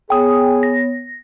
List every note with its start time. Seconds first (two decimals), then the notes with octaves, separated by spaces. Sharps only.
0.10 B3 G#4 C#5 G5 D#6
0.63 A#6